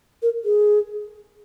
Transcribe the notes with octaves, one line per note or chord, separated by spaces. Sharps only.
A#4
G#4